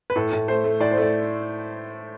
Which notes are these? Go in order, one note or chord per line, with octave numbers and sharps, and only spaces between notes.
B4
A2 A4
A2
A3 C5
A3
A2 D5
C5
A3
D5